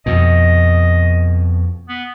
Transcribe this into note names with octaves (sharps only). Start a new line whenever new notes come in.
F2 B2 D#5
B3